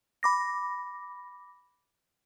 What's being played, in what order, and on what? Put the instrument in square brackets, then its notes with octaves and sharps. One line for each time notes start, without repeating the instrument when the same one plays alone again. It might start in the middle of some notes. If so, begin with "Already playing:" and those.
[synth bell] B5 D6 A#6